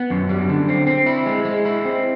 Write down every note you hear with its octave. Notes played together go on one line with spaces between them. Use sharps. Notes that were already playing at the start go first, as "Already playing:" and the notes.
Already playing: B3
F#2
G3
D3
C4
C4
E4
G#3
G#3
E4
C4